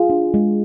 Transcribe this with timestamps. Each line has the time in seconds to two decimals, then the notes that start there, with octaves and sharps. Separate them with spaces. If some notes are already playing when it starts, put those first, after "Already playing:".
Already playing: F4 G#4
0.10 D4
0.34 G#3